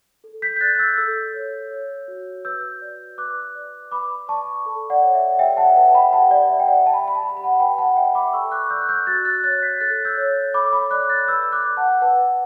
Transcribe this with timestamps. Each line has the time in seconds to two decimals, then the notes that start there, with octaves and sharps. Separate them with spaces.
0.24 A4
0.42 G6 B6
0.56 G6
0.60 D5 F#6 A6
0.75 A6
0.79 E6 G6
0.97 A4 E6 G6
1.34 C#5
1.71 C#5
2.08 F#4
2.45 B4 E6 G6
2.82 D5
3.18 B4 D6 F#6
3.55 D5
3.92 B4 B5 D6
4.28 D5 A5 C#6
4.66 A4
4.90 D5 F#5
5.02 C#5
5.15 E5
5.30 F#5
5.39 G4 E5 G5
5.57 F#5 A5
5.76 B4 F#5 A5
5.89 A5
5.94 G5 B5
6.13 G4 F#5 A5
6.31 D5
6.50 D5 E5
6.60 G5
6.68 D5 F#5
6.86 D5 A5
6.94 B5
7.01 A5
7.08 B5
7.15 A5
7.22 G4 B5
7.29 A5
7.37 B5
7.44 F#5 A5
7.60 B4 G5 B5
7.78 F#5 A5
7.97 D5 E5 G5
8.15 B5 D6
8.33 A4 C#6 E6
8.52 D6 F#6
8.70 D5 E6 G6
8.81 F#6
8.89 E6 G6
9.07 F#4 F#6 A6
9.25 F#6 A6
9.44 C#5 F#6 A6
9.62 G6 B6
9.80 A4 F#6 A6
10.05 E6 G6
10.17 C#5
10.54 A4 B5 D6
10.73 B5 D6
10.91 D5 D6 F#6
11.09 F#6 A6
11.28 B4 E6 G6
11.52 D6 F#6
11.65 D5
11.77 F#5 A5
12.02 B4 F#5 A5